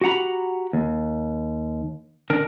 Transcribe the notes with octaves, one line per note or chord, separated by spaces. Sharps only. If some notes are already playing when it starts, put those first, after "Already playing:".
F#4 G4 F#5 A#5 B5
D#2
D#3 D4 A#4